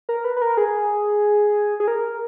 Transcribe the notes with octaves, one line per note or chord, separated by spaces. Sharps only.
A#4
B4
B4
A#4
G#4
G#4
A#4